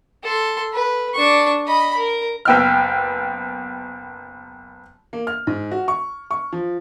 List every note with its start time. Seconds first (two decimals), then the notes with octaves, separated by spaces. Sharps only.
0.24 A4 C6
0.73 B4
1.14 D4 C#6
1.67 D#5 B5
1.97 A#4
2.45 F#1 B3 G5 E6 F6
5.13 A#3
5.27 F6
5.47 G#2
5.72 F#4
5.88 C#6
6.31 C#6
6.53 F3